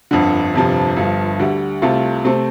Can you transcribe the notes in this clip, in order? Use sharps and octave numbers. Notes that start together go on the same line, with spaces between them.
G1 F2 D3
G1 F2 C3 F3
G1 G2 F3
D2 D3 G3
C2 C3 A3 F4
C3 A3 C4